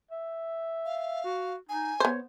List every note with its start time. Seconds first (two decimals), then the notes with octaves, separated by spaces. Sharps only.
0.11 E5
0.86 F5
1.25 F#4
1.69 D#4 G#5
2.00 B3 C5 C#5